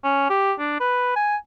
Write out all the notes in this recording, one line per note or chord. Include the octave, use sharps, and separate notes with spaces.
C#4
G4
D4
B4
G#5